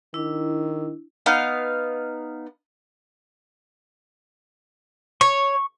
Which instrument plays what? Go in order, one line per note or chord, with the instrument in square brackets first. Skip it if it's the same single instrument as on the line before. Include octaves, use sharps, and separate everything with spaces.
[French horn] D#3 [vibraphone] D4 E4
[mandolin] B3 D#4 F5
[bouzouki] C#5 [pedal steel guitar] C#6